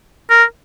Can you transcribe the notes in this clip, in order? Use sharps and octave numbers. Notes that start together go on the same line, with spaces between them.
A#4